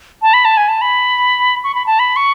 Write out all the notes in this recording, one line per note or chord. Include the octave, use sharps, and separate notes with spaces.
A5
B5
A5
G#5
A5
B5
C#6
B5
A5
B5
C#6